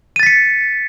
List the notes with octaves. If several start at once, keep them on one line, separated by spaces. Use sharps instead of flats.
A6 B6 C#7 D#7